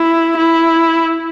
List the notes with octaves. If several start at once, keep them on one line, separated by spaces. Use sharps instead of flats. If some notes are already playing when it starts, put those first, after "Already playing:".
Already playing: E4
E4